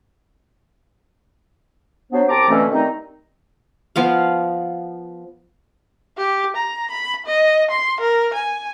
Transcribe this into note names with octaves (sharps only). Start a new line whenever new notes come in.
F#3 B3 D4 C5
C2 C4 G4 A5 A#5 D6
B2 D3 E3 A3 C4 C#4
D#3 G3 A3 C4 D#4
F3 B3 F5
G4
A#5
B5
D#5
C6
A#4
G#5